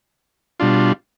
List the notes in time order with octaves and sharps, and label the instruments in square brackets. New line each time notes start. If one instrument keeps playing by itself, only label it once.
[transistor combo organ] B2 G3 D4 F4